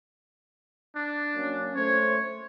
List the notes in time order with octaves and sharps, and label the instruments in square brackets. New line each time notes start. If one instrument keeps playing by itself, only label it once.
[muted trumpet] D4
[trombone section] F#3 A#3 C#4
[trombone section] A3 C5 [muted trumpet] C#5